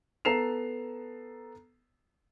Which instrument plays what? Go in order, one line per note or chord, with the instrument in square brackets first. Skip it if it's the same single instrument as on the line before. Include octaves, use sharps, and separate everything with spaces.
[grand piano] B3 A4 A#5 C7 E7 F7